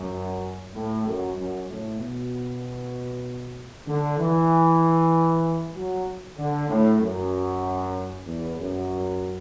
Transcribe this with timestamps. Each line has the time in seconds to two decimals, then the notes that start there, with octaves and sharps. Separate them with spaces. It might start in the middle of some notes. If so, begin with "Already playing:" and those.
Already playing: F#2
0.73 A2
1.05 F#2
1.35 F#2
1.68 A2
1.98 B2
3.86 D3
4.17 E3
5.74 F#3
6.36 D3
6.68 A2
6.99 F#2
8.24 E2
8.56 F#2